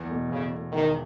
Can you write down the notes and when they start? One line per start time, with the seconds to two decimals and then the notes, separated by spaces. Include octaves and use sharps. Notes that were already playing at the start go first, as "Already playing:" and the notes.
Already playing: E2
0.09 B2 A3
0.30 E2 C#3
0.52 B2 A3
0.73 E1 D#3